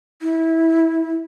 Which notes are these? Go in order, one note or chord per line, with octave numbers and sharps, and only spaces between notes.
E4